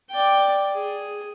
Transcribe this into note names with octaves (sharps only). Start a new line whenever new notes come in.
D5 G5
G#4